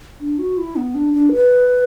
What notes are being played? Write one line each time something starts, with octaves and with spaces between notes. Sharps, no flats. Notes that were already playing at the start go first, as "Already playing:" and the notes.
D4
F#4
E4
B3
D4
D4
B4